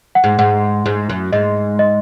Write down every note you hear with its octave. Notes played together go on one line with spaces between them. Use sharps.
F#5
G#2
G#2 F#5
G#2
F#2
G#2 D#5
D#5